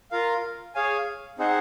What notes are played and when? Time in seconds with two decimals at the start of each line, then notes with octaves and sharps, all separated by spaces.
0.11 F4 A#4 F5
0.75 G#4 C#5 F5 G#5
1.38 C4 D#4 G#4 C5 F#5